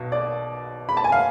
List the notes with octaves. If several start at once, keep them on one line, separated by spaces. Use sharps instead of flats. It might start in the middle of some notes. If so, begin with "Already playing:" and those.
Already playing: B1 B2
D5
B5
A5
G#5
F5